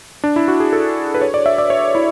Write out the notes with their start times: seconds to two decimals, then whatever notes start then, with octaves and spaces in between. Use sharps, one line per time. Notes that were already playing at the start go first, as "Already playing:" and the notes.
0.24 D4
0.36 E4
0.48 F#4
0.60 G#4
0.73 A4
1.14 B4
1.22 C#5
1.34 D5
1.46 E5
1.58 D5
1.70 C#5
1.95 E4